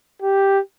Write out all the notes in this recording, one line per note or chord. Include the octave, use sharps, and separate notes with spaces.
G4